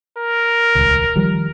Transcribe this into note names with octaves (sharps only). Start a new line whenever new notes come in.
A#4
D#1 C#2
D#3 F3 G3